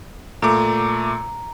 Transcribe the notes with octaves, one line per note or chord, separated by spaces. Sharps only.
A#2 A3 A#5 D6